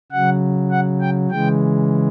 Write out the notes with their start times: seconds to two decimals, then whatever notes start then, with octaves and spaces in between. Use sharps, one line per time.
0.12 C#3 F#3 F#5
0.71 F#5
1.01 G5
1.31 C#3 E3 G#3 G5